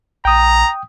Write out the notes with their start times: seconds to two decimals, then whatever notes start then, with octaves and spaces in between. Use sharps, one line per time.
0.25 A#1 G5 A#5 D#6